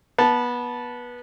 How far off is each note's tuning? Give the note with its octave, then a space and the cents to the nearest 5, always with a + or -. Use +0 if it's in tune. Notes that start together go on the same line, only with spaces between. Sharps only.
B3 -20 A5 -10